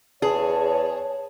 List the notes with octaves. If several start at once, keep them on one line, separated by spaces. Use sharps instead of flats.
E2 G#4 C#5 A5